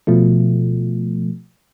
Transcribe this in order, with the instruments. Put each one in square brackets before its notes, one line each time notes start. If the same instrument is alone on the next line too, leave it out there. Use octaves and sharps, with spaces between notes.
[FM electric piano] B2 F3 A3